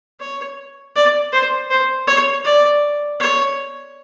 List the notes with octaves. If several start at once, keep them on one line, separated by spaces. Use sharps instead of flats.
C#5
D5
C5
C5
C#5
D5
C#5